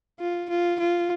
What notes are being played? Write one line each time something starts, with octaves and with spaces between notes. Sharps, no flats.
F4
F4
F4